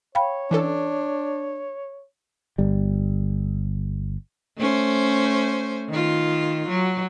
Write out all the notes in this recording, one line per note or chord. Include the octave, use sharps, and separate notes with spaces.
C#5 F5 G5 B5
E3 C#4 D4 A4
G1 G3
A3 C#4 C5
D#3 F4
F#3